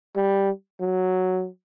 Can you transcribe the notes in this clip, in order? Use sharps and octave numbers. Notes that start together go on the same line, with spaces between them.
G3
F#3